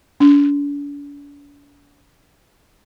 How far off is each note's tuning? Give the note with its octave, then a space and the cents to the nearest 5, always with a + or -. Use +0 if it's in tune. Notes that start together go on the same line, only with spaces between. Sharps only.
D4 -45